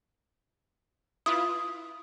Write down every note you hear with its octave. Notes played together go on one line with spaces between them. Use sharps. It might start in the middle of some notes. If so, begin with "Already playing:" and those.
E4 F4 B4 D#6